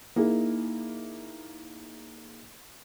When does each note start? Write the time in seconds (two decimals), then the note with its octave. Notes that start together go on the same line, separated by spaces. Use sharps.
0.16 A#3 D#4 E4 G#4